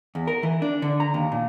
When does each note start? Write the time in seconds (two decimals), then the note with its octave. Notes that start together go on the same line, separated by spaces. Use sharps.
0.15 E2
0.27 A#4
0.43 E3
0.62 D4
0.82 D3
1.00 A#5
1.14 D#2
1.32 A#2